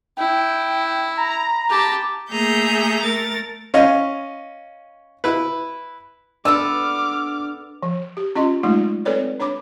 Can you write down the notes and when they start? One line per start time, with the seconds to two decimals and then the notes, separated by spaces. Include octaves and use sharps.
0.18 E4 G5
1.17 A#5 B5
1.70 G4 A5
2.32 A3 A#3 G#4 E5 A#5 G6
3.03 A3 A#4 A6
3.74 C#4 D#5 F5
5.24 E4 B4
6.45 B3 D4 A4 D6 E6 F6
7.83 F3
8.17 G4
8.36 C#4 F4 D#5 C6
8.63 F#3 G#3 A3 D#4 F4
9.05 C4 A4 B4 C#5 D5
9.40 D4 C#5 B5 D6